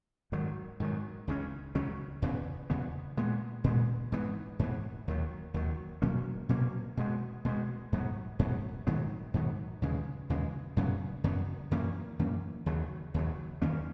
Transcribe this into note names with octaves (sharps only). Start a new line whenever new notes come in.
G#2 D#3 F#3
G#2 D#3 F#3
C#2 C#3 F#3 C#4
C#2 C#3 F#3 C#4
E2 C#3 E3 B3
E2 C#3 E3 B3
A#2 G#3 B3
A#2 G#3 B3
G#2 E3 B3
G#2 E3 B3
D#2 D#3 F#3
D#2 D#3 F#3
B2 F#3 A#3 C#4
B2 F#3 A#3 C#4
B2 G#3 B3
B2 G#3 B3
G#2 F#3 B3
G#2 F#3 B3
G#2 D#3 F#3 B3
G#2 D#3 F#3 B3
D#2 C#3 E3 G#3
D#2 C#3 E3 G#3
F#2 C#3 F#3 B3
F#2 C#3 F#3 B3
F#2 E3 A#3 C#4
F#2 E3 A#3 C#4
D#2 C#3 F#3
D#2 C#3 F#3
E2 D#3 A#3 C#4